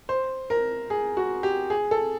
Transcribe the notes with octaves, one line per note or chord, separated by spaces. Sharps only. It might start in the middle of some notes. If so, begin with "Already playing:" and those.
C5
A#4
G#4
F#4
G4
G#4
A4